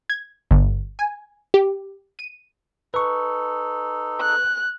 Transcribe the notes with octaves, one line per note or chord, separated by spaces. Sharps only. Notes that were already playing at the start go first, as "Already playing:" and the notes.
G#6
G1
G#5
G4
D#7
D#4 A4 B4 C#6
F#6